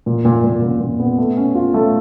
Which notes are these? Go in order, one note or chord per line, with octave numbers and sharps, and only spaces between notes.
A#2
A#2
A#2
A#2
A#2
B3
A3
C#4
F4
A3